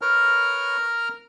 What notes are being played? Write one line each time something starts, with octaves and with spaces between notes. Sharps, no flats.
A#4 B4 C#5 A#5 F6